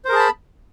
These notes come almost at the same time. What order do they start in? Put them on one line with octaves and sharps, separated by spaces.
C5 A#4 G#4 A5 B5